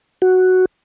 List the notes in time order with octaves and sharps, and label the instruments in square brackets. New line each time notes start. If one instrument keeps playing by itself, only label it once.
[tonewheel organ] F#4